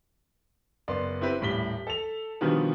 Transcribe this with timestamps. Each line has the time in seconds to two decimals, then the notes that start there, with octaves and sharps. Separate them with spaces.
0.88 F#1 B3 D5 C6
1.21 C4 E4 G4 B4
1.41 D#1 A2 G3 B6 G7
1.87 A4 F7
2.41 B2 D3 D#3 F3 G3 B3